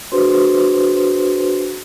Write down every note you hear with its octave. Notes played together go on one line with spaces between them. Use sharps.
D4 F#4 G#4 B4 C5 C6